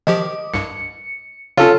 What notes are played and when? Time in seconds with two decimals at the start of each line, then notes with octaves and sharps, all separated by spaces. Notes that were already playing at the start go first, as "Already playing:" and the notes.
0.07 D#3 F3 G4 D#5 D6
0.54 C2 G2 C#7
1.57 C#3 C#4 F4 A4 C#5